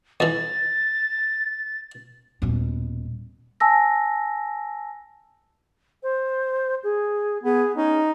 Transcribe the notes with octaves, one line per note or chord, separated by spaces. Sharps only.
F2 E3 A6
D#1 B2
G#5 A5 E6 A#6
C5
G#4
B3 G#4
C#4 D#4